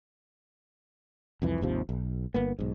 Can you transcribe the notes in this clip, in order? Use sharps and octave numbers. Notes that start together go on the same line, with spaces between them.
C2 F2 E3
G#1 D#2 C3 F3
B1
G1 A#3 B3
B1 G#2